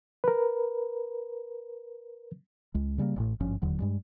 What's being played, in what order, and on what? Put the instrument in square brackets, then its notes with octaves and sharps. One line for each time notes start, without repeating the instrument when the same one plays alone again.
[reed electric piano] A#4 B4
[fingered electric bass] C#2 G#3
C#3 G3 G#3 A#3
D#1 A1 A2
G#1 G2 F3 C#4
E1 D#2 D3 F#3
G2 G3 G#3